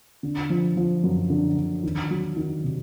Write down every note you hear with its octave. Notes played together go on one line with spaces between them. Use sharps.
D3
F3
F3
F#2
D3
D3
D#3
F#3
D#3
C3